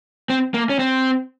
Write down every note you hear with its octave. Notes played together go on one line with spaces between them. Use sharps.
C4
A#3
C#4
C4